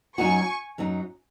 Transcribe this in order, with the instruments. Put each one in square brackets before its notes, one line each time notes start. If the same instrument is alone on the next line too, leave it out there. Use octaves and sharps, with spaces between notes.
[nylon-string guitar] F#2 F#3 D#4 F#4 [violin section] G#5 C#6
[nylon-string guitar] F#2 F#3 D#4